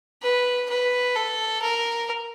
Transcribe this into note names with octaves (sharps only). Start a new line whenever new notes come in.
B4
B4
A4
A#4